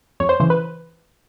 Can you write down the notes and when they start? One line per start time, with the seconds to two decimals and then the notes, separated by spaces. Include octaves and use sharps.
0.20 F2 C#5
0.29 C5
0.40 C#3 E3 C5
0.50 B4